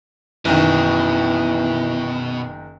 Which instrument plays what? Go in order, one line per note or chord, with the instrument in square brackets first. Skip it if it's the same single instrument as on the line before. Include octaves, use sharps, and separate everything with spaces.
[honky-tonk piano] F#1 D#3 [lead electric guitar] B2 [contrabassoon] E3